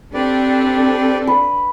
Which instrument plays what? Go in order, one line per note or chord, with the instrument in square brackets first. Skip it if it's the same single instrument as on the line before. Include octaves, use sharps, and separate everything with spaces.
[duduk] C4 [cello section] D4 A4 [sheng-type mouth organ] G4 B4 D5
[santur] B4